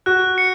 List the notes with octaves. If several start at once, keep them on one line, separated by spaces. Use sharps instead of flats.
F#4 F#6
C#7